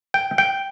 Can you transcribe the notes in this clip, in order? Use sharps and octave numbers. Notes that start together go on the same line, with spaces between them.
G5
G5